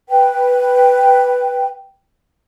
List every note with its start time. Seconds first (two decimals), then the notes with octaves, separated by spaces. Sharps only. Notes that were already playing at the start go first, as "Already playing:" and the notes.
0.09 B4 G5